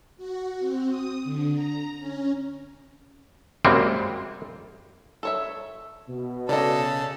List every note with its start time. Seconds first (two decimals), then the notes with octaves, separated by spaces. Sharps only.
0.17 F#4
0.60 C4
0.89 D#6
1.24 D3
1.54 A#5
2.00 C#4
3.65 F#2 G3 G#3 A#3 C4
5.23 A4 C#5 E5
6.09 B2
6.49 C#3 A4 D5 D#5